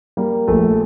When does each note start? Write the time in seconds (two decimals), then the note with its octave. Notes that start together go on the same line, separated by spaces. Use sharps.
0.17 G3 A#3
0.48 A#1 A3